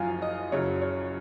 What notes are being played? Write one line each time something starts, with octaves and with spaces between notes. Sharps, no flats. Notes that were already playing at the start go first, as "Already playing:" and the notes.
Already playing: F#1 F#2 F3 F5 G#5
D#5
F#1 F#2 C#3 F#3 C#5
C#5